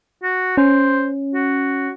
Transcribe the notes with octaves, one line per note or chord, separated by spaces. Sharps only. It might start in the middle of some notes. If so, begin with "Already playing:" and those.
F#4
C#4 C5
F#4